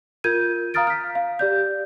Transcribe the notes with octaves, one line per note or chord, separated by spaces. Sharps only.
F4 A#4 G6 G#6 D#7
F5 A#5 D#6 F6 A6 D7
F6 B6
F5
G4 D5 G6